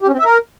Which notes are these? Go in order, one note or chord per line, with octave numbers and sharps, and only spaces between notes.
G4
C#4
C4
E5
A#4